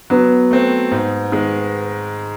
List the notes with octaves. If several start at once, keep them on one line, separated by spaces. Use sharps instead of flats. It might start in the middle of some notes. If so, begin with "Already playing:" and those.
F#3 B3
A3 C4
G#2
D#3 G#3